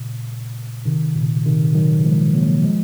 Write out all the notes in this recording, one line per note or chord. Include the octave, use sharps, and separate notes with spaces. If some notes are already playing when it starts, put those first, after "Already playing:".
Already playing: A#2 C#3
C3 D#3
A#2 C#3
C3 D#3
D#3 F#3
F3 G#3
F#3 A#3
F3 G#3